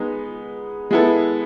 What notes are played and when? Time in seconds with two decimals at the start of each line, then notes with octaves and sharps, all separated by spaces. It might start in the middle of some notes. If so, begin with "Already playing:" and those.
Already playing: G#3 B3 D#4
0.91 G#3 B3 E4 A4